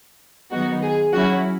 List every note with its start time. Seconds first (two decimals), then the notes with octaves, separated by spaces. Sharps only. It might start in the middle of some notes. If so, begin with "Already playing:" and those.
0.51 D#3 F#3 B3 D#4 F#4
0.82 G#4
1.13 F#3 C#4 E4 F#4